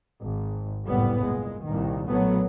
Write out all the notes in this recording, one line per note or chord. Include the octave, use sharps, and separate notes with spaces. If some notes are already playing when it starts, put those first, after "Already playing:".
G#1
F#1 C2 A2 G3 B3
A#2 G#3
C2 A#2 D#3
B1 A#2 F#3 A3 B3